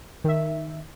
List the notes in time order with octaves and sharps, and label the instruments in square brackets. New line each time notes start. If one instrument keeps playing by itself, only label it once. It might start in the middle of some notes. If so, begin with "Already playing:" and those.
[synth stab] D#3 E5